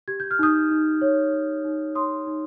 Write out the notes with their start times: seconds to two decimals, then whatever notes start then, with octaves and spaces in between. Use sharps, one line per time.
0.08 G4 G#6
0.20 G6
0.31 F6
0.39 D#4 D#6 G6
0.71 D#4
1.02 C#5
1.33 C#5
1.64 D#4
1.95 C#5 C6 D#6
2.27 D#4